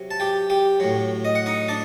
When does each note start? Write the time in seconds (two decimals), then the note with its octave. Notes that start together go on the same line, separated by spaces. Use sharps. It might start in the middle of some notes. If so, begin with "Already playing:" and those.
Already playing: C3 F#3
0.11 A5
0.20 G4 G5
0.50 G4 G5
0.80 A2 F#3
1.25 D#5
1.35 F#5
1.46 D#4 D#5
1.68 D4 D5